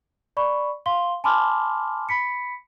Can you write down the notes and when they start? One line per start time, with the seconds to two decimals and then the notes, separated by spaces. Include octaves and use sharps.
0.37 D5 B5 C#6
0.86 F5 C6 G7
1.24 G#5 A5 B5 C6 D6 F6
2.09 B5 B6 C#7